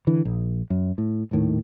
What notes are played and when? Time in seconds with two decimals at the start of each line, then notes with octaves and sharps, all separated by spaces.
0.07 D3 E3
0.25 A#1
0.70 F#2
0.98 A2
1.31 D#1 D#2 A2 D#3